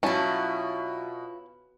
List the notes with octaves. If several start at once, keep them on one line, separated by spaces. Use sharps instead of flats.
B2 F#3 C#4 E4 F4 G#5 A5